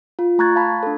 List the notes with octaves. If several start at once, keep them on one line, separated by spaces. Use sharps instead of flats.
F4
A3 A#5 C#6 F#6 G#6 A6
F5 A5 B5
D4 A4